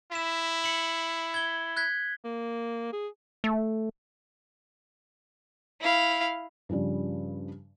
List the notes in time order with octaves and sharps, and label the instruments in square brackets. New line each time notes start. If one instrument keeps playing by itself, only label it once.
[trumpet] E4 [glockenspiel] B6 E7
[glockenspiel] C#7 F#7
G#6 G7
F#6 G#6 B6
[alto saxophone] A#3
G#4
[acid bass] A3
[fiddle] E4 F5
[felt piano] G2 C#3 F3 G3